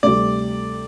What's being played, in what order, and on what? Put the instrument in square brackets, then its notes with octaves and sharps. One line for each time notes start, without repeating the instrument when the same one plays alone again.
[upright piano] D2 C3 G3 [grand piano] D5